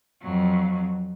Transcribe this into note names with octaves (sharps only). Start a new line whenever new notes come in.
F2 F#3